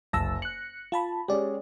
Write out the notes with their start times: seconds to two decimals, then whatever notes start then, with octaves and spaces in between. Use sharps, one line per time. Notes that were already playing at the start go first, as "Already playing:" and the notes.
0.13 F#1 C2 A5 E6 A#6
0.42 F#6 C#7 F#7
0.92 F4 A5 B5
1.28 G#3 C#4 G4 C#5 D5